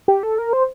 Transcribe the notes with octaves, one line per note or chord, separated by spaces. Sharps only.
G4
A4
A#4
C5